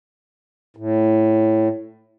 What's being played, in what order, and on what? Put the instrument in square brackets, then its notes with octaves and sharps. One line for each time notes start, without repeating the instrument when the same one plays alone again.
[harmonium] A2